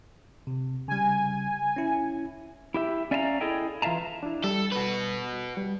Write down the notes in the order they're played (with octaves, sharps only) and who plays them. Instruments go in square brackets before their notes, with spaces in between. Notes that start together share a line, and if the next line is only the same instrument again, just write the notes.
[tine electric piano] C3
[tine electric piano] C#3 G3 [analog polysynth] G#5
[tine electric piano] C#4 E4
[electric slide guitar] E4 G4 E5
C#4 D5 E5 F5 A5 A#5
E4 G#4 A4 D#5 G5
E3 F4 E5 F5 A5 A#5
[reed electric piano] D4 E4
[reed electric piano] G3 [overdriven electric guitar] A4
[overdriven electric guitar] F#4 B4
[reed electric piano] G3